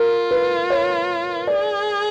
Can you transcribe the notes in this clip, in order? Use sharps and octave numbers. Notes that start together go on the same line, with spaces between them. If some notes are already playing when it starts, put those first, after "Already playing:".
Already playing: F4 A#4
B4
C#5
G#4 D5